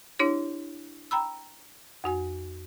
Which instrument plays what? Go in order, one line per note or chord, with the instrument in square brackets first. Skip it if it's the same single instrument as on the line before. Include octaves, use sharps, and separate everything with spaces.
[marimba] D4 E4 G4 C#5
G5 A#5 B5 E6
F2 F#4 G#5